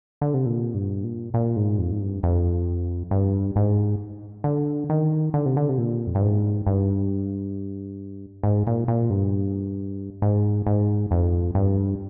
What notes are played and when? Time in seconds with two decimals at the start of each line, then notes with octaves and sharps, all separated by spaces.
0.21 D3
0.34 C3
0.46 A#2
0.74 G2
1.04 A#2
1.34 A#2
1.56 G#2
1.79 F2
1.92 G#2
2.00 G2
2.23 F2
3.11 G2
3.56 G#2
4.44 D3
4.90 D#3
5.34 D3
5.46 C3
5.57 D3
5.69 C3
5.78 A#2
6.07 F2
6.15 G2
6.22 G#2
6.67 G2
8.43 G#2
8.67 A#2
8.88 A#2
9.10 G2
10.22 G#2
10.67 G#2
11.11 F2
11.55 G2